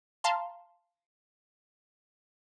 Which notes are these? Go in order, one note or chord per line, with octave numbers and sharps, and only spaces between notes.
F5 A5 A#5 C6